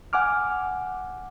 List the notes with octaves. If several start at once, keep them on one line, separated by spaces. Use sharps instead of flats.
F#5 G#5 D6 F6